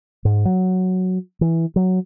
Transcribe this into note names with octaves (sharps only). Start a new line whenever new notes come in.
G#2
F#3
E3
F#3